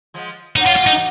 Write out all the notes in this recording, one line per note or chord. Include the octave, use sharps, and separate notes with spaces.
F3 G#3
F#3 A#3 D#4
F4
F4
D#4